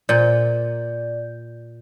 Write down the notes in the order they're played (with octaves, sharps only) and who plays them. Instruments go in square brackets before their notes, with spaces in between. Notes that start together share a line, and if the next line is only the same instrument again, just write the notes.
[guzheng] A#2 [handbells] D5 G6